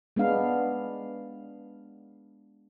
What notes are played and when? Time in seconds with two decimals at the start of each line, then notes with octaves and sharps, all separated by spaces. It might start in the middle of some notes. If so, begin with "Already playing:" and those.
0.16 G#3 B3 D4 F5